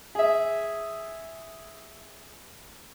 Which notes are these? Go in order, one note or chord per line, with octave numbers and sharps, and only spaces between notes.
G#4 E5